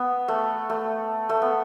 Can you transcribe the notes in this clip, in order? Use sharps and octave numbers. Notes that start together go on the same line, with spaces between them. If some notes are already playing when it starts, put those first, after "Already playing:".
Already playing: B3
A3
A3
A3
B3